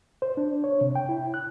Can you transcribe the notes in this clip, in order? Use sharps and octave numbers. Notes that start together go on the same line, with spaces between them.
C5
D4
C#5
C3
G5
E4
F#6